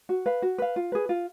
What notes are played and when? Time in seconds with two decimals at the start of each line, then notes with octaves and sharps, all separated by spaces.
0.09 F#4
0.26 B4 F5
0.42 F#4
0.58 B4 F5
0.76 F4
0.92 G#4 B4
1.09 F4